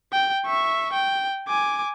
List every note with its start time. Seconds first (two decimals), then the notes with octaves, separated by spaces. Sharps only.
0.13 G5
0.46 E5 C#6
0.93 G5
1.48 G#5 D6